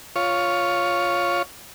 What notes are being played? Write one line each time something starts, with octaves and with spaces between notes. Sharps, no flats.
F4 C#5